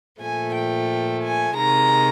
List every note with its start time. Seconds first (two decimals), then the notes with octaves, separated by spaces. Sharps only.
0.20 A#2 F3 A3 G#5
0.54 G5
1.22 G#5
1.55 C3 D#3 G#3 A#5